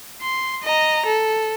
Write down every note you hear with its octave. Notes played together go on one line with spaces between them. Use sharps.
C6
D#5 A#5
A4